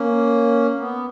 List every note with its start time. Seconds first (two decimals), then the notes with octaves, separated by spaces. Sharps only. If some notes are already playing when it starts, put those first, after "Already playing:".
Already playing: A#3 C#4
0.79 B3